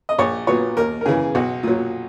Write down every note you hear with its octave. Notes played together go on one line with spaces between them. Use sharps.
D#5
A#1 C#5
A#2 F#3 B3 C#5
D#2 A#4
A#4
C#3 E3 G#4
B1 F#4
A#2 F#3